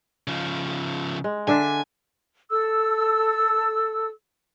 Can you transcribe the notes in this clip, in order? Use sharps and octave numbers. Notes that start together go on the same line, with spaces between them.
C#3 F3
G#3
D3 D4 E5 G#5
A4 E6